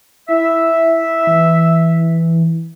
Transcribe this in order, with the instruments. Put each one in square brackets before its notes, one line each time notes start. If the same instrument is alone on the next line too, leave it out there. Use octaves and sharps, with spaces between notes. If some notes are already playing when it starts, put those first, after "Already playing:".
[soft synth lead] E4 [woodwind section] E5
[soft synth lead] E3